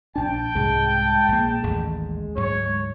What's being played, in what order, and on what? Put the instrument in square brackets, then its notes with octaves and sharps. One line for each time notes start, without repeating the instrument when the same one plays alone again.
[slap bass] A#1 D4 [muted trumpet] G5 [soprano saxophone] A5
[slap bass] C2 G#2 C3 [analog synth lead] G#3
[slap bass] A#1 A#3
[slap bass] A1 D#2 A2 [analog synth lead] G#3
[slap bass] D2 G#2 F#3 [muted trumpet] C#5